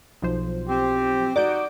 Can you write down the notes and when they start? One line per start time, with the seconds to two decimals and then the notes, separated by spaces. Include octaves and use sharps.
0.22 B1 F3 C5
0.69 C4 G4
1.36 D#4 F#4 D5 D6 G6 D7